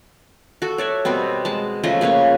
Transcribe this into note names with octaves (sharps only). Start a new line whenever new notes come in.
F#4 A4
C#5 D5 E5
B2 G3 B3 C4
G#3 A5
C#3 F3 A3 D#5
C#3 A#3 B4 C#5